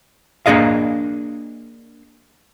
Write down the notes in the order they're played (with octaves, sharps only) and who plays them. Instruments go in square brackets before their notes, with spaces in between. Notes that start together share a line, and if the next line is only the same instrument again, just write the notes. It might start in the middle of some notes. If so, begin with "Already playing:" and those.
[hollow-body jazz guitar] A#3 D4 G#4 D#5 F5